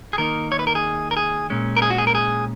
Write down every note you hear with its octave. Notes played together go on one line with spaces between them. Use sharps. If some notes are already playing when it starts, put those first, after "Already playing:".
G#4
D#3 A#3 D#4 A#4
C#5
B4
A#4
G#4
A#4
G#4
A#2 G#3 C#4
A#4
G#4
F#4
G#4
A#4
G#4